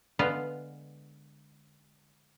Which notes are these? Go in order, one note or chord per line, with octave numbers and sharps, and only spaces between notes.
D3 G#3 B3 F4 B4 F5